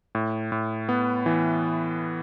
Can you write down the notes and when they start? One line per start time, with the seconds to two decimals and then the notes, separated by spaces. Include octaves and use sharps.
0.15 A2
0.52 A2
0.89 B3
1.26 E3